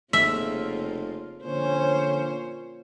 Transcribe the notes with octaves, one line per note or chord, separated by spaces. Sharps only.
F1 C#3 A#3 F4 E5
A#2 D3 F3 C#4 C5 C#5